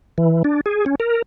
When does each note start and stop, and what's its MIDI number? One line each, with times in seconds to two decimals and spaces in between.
0.18 0.43 52
0.44 0.61 62
0.66 0.85 68
0.86 0.95 61
1.00 1.22 70